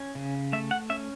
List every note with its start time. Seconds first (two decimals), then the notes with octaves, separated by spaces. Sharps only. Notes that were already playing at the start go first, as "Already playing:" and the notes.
Already playing: C#4
0.15 C#3
0.53 A3 E5
0.71 F#5
0.90 C#4 E5